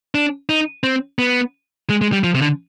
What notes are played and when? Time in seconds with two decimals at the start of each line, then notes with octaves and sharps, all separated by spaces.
0.15 D4
0.49 D#4
0.83 C4
1.19 B3
1.90 G#3
2.02 G#3
2.12 G3
2.24 F3
2.35 C3
2.41 D3